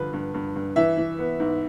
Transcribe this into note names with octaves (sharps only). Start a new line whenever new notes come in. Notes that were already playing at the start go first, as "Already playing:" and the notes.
Already playing: G2 D3 F3 B4
G2
G2
G2
E3 E5
E3
B3
G#2